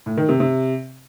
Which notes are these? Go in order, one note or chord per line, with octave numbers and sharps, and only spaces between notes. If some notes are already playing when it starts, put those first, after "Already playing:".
A2
D#3
C3
C3